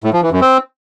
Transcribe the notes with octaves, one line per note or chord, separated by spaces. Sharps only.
A2
F3
E3
F#2
C4